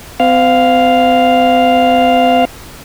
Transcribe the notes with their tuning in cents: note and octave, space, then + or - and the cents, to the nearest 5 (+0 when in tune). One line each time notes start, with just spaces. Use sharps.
C4 -40 F5 +0